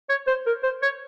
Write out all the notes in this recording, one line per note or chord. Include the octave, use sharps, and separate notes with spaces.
C#5
C5
A#4
C5
C#5